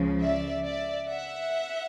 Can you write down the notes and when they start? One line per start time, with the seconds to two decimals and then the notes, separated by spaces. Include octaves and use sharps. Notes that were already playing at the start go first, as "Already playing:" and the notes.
Already playing: C#2 C#3 F3
0.23 D5 E5
0.65 D5 E5
1.08 E5 F#5